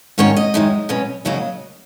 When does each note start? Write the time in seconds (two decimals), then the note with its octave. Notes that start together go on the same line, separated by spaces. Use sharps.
0.18 G#2 D#3 A#3 C#4 C#5
0.36 D#5
0.54 F#2 D#3 G#3
0.89 B2 F#3 C#4
1.25 D#2 C#3 F#3 A#3 D#5